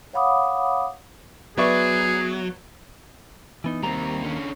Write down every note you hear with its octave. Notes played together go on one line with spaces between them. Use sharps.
C#5 F5 F#5 B5 D6 D#6
F#3 B3 G#4 B4 D5 E5 C#6
E3 B3 D#4
D#2 D#3 G3 C4 A#5
D3 C#4